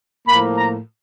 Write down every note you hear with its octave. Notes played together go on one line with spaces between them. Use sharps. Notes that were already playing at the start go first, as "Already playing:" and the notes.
A2 F3 A#3 B5
A#5